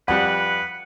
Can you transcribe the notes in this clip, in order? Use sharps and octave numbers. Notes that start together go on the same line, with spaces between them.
F2 G3 B4 F#5